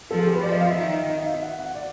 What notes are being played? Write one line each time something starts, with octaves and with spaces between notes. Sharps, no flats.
F3 A4
G#4
G4
B4
F3 D5
D#5
F5
E5
D#3
D#5
E5
F5
E5
F#5
F#5
D5